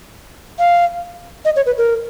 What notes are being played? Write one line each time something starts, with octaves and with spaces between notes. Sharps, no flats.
F5
D#5
C#5
B4
A#4